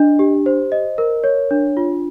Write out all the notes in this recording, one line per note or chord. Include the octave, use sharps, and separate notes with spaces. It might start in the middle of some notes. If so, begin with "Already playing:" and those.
Already playing: D4 D#5
G4
C5
D#5
A#4
C#5
D4
F4